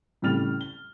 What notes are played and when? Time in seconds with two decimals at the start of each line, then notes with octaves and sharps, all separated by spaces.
0.22 A2 C#3 G3 F6 A6 F7
0.61 G7